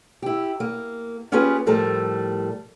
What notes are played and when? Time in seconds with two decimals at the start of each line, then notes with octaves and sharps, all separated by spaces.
0.22 E4 G4
0.60 A#3
1.32 A#3 C#4 F4 G4 G#4 B4
1.66 A2 F3 G3 A3 A#4 A5